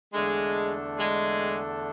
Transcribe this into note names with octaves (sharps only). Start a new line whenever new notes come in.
E2 D3 G#3 A3 D4 A4
G#3